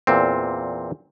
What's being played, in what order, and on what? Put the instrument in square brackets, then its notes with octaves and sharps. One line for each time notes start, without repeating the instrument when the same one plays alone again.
[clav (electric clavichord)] E2 A#2 C4